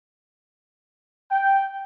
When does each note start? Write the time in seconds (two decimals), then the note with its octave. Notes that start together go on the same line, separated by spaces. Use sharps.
1.31 G5